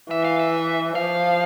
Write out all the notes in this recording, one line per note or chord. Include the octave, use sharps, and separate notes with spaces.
E3 E5
F5
E5
F3 F5